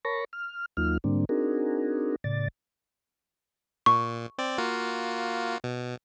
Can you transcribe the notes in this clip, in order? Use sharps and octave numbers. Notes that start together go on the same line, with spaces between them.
A#4 C#5 A5 B5 C#6 A#6
F6
D#2 F#3 A#3 D#4 F4 F6
G#2 D3 G3 A#3 C4 D4
C4 D4 D#4 F#4 G#4 A#4
A2 C#3 D5 A6
A#2 C#6
C4 D5
A#3 F4 F#4
B2